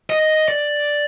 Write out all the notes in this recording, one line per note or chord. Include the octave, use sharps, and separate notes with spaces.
D#5
D5